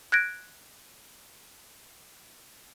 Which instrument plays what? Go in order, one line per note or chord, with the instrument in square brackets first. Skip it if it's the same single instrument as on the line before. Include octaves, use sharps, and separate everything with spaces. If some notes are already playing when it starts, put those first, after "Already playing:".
[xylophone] F#6 G#6 A#6 D7